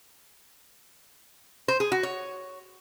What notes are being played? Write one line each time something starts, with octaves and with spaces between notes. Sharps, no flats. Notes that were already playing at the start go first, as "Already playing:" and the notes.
C5
G#4
F#4
C#5